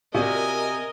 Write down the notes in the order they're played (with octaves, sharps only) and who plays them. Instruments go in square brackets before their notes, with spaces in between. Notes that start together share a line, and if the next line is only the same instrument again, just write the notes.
[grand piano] C3 [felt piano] F4 F#4 D5 [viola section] A#4 D#5 [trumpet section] G#5